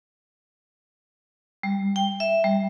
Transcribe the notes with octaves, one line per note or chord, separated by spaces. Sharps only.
G3
G5
E5
G3